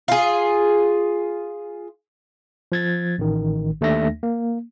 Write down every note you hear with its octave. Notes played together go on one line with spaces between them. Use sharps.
F4 G#4
F3 G#6 A6
A1 D#3
D#2 A3 D4 E5 A#6
A#3